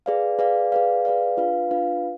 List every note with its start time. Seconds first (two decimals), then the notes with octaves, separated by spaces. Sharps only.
0.06 G#4 B4 D5 F5
0.39 G#4 B4 D5 F5
0.72 G#4 B4 D5 F5
1.05 G#4 B4 D5 F5
1.37 D4 F4 B4 F5
1.71 D4 F4 B4 F5